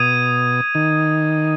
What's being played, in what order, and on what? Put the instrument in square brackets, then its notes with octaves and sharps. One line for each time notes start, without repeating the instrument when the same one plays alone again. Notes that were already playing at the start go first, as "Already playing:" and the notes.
Already playing: [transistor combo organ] B2 [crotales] D#6 G#6 D#7
[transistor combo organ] D#3